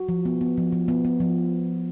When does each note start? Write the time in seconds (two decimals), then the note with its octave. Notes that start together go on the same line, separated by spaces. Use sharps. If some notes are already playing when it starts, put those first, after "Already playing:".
Already playing: F#4
0.09 F3
0.25 B3
0.41 B3
0.58 F3
0.72 F3
0.88 B3
1.05 B3
1.20 F3